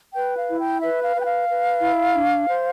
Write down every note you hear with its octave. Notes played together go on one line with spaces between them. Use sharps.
B4 G5
F5
E4
G5
B4 E5
F5
B4
G5
F5
B4
E4
D4
C5